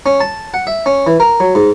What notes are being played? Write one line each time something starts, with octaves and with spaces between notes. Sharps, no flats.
C#4
A5
F#5
E5
C#4
E3
A#4
F#3
G#2